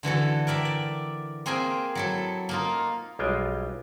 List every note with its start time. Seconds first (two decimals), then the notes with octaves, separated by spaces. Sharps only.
0.03 D3 E3 F#4 A4
0.47 A#4 D5 E5 G5
0.65 D5
1.46 A#3 C4 G#4 A#4 G5 G#5
1.95 F#3 E4 A4
2.49 A#3 D#4 F4
3.19 B1 G3 G#3 F4 G5 G#5